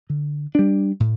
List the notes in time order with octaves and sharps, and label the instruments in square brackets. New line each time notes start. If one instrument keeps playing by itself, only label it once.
[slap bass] D3
G3 D4
A2